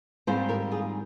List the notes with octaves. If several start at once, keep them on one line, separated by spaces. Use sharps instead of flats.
G#2 D#3 G3 C4 F4 G#4 C5
G4 A#4
F4 G#4